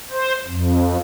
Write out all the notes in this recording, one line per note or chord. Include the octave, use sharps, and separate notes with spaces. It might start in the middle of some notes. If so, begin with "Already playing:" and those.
C5
F2